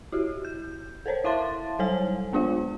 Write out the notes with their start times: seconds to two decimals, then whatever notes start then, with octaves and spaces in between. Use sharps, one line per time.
0.12 E4 F#4 G4
0.45 G6
1.06 A4 A#4 C5 C#5
1.24 E4 E5 F5 A5 C6 A6
1.79 F#3 G3 A4 C5 C#5 G#5
2.33 G#3 B3 D4 F4 C5 F5